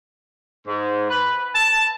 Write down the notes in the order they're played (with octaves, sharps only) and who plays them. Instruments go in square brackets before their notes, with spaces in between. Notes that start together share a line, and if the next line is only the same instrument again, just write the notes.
[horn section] G#2
B4
A5